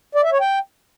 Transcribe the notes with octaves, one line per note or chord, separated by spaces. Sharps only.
D5
E5
C#5
G5